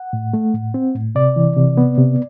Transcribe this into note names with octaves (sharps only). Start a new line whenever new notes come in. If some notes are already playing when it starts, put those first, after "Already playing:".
Already playing: F#5
A2
A3
A2
C4
A2
C3 D5
E3
C3
B3
C3